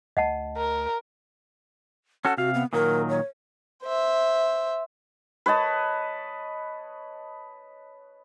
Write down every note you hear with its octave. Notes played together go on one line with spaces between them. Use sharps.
D2 D#5 F#5 A5
A#4
C#4 F#4 A4 F#5
C3 F#4 F5
B3
A#2 D#3 F#3 A#4
C#5
C5 E5
B4 C#5 D#5 A5